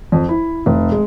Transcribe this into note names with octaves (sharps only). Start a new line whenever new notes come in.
F2
E4
F1
G#3